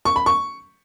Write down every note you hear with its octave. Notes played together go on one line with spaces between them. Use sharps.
C#6
B5
C#6